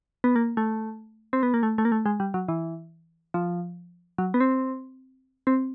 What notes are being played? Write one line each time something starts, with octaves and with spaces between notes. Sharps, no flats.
B3
A#3
A3
C4
B3
A#3
A3
A3
A#3
A3
G#3
G3
F#3
E3
F3
F#3
B3
C4
C4